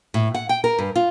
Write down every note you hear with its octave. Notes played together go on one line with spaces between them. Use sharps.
A2
F#5
G5
A#4
G2
F4